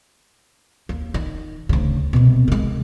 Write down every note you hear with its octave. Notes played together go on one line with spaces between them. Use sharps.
D#2
D#3
D2 C#3
C2 B2
D#3 G#3